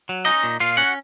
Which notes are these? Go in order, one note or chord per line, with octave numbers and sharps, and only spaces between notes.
F#3
C#4 D#4 D#5
A#2
A#2 F4 F5
C#4 F#4 F#5